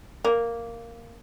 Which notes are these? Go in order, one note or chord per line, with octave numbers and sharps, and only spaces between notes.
A#3